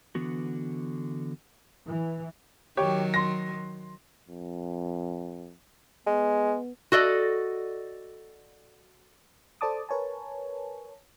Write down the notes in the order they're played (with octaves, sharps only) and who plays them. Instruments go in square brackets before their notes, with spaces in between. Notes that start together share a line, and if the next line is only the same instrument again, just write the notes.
[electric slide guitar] D3 E3 B3 F#4
[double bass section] E3
[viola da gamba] D#3 F#3 [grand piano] G4 C#5
[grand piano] C6 A#6
[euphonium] F2
[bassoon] G#3 [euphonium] B3
[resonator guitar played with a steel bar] F#4 A4 D5 D#5
[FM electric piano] A4 C5 D5 A5 D6 D#6
A#4 B4 C#5 G#5 A5